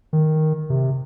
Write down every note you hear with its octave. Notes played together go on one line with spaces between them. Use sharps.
D#3
C3